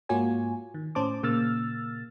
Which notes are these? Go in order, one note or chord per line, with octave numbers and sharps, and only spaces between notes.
G#2 A#3 F4 F#4 C#5 G#5
D#3
A2 C#4 C5 A5 D6
A#2 C#3 A#3 E6 F6 A6